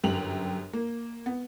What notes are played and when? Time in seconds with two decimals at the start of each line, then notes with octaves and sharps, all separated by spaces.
0.04 G1 F#2 G4 F7 F#7
0.73 A#3
1.26 B3